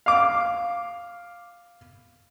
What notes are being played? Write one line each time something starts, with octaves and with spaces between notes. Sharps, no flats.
F5 D6